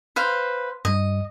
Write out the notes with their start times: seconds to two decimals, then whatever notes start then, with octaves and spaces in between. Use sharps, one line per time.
0.16 B4 C5 F5
0.85 G2 G3 D#5